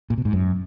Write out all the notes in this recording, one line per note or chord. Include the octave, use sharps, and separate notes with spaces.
A#2
B2
G#2
F#2